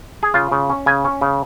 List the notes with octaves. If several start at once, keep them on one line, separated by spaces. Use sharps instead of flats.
G#4
C#3 F4
C#3
C#4
C#3 G#5
C#4
C#3